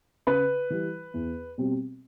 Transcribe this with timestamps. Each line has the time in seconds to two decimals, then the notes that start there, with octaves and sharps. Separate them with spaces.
0.27 C#3 B4
0.70 E3 G3
1.14 E2
1.58 B2 G3 C4